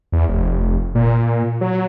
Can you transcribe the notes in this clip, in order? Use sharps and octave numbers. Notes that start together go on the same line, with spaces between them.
E2
F1
A#2
F#3